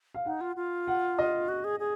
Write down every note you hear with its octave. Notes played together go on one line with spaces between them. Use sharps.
F5
D#4 F#5
F4
F4
F#5
D#5
F#4
G#4
G#4